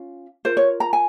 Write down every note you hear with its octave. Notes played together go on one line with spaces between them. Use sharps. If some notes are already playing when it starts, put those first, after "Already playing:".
Already playing: C#4 F4
F4 A#4 C5
C#5
A#5
G#5